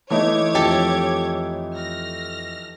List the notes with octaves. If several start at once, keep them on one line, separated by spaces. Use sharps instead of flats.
E3 A3 D#4 C#5 D6 G#6
F2 F3 G4 A4
F6 A#6